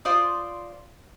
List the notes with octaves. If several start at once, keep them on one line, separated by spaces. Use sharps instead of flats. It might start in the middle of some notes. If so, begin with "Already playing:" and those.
F4 C5 D5 D#6